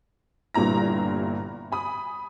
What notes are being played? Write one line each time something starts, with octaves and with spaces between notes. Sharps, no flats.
G1 G2 A#2 E4 A#5 A#6
G#5 B5 D#6